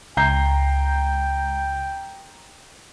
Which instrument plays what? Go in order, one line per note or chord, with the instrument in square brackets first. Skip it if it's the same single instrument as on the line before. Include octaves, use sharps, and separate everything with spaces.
[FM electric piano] C#2 [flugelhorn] G5 [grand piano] A#5 G6 C7